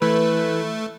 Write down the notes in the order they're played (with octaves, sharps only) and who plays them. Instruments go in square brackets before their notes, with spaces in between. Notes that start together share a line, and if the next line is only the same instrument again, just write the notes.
[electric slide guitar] E3 [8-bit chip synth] A3 [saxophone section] B4